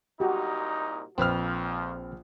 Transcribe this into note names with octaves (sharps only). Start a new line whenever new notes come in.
C2 A#2 D#4 F#4 G4
A#1 F2 F3 C4 B4 C5 F6